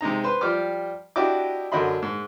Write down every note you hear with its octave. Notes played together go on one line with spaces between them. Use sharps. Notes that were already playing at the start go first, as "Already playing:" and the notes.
C3 G#3 D#4 A#5
B4 C5 C6
F3 G3 G5 D6 F6
D4 E4 F#4 G4 D#5 D6
F#2 D3 F#3 D#5 B5 C6
G#2